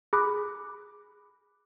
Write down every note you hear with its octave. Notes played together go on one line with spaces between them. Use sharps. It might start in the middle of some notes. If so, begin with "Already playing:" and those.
G#4 B5 D6 F#6